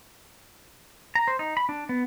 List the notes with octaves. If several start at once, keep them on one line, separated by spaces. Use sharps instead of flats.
A#5
C5
D#4
B5
D4
B3